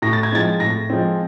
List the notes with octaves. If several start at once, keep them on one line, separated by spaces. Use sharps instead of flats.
A2 A#6
A6
G#6
F3 G#3 C4 A6
A2 A#6
F3 G#3 C4